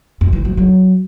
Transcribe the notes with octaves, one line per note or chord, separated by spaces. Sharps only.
F#2
E3
F#3
F#3